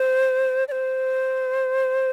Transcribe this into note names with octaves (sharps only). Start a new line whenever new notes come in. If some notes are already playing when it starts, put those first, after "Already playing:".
Already playing: C5
D5
C5